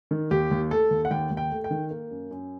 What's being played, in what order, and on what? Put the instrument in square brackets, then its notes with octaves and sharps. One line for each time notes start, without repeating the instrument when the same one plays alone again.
[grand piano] D#3
D#2 G4
D#2
A3 A4
D#2
F#5
D#2 G5
D#2
G5
A3
G5
D#3
A#3
F#2
F#2